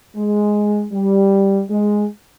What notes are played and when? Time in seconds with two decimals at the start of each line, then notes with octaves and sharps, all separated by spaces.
0.16 G#3
0.93 G3
1.70 G#3